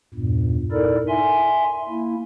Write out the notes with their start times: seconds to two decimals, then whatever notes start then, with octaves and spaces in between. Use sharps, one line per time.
0.14 E2 G2 A#2
0.72 D#4 E4 A4 A#4 D5
1.08 E5 G#5 C6
1.89 A#3 E4